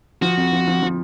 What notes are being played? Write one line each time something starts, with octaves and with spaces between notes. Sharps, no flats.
F3 F#4
F2
F3
F3
F3